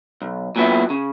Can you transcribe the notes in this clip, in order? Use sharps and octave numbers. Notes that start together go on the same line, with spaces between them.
B1
A#2 F#3 B3 E4
C#3